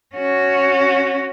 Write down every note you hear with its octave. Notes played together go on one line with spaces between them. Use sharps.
C#4 F#4